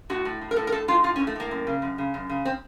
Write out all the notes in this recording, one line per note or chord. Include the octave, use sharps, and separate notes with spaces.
A2 F#4
A2
A2
A#4
A2 A4
A#4
A2 A4
A2 F4
A2 F4
C#4
A2
A3
A2 A#3
F#2
C#3
F#2
C#3
F#2
C#3
C4